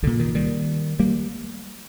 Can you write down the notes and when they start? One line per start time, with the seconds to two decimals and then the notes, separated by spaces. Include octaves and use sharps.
0.03 C2 A#2 D3
0.19 D#3
0.35 D#3 G3
0.99 G3 A#3